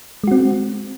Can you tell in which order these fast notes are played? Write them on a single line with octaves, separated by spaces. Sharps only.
G#3 F#4 C4